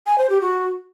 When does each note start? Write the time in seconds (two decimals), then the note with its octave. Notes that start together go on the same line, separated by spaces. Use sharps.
0.07 G#5
0.18 C5
0.30 G4
0.41 F#4